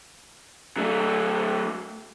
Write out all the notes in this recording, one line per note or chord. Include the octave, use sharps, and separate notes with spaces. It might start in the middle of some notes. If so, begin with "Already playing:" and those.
F#3 A3